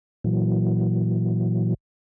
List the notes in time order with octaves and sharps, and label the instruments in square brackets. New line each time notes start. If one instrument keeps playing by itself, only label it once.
[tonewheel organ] A#2 E3 F#3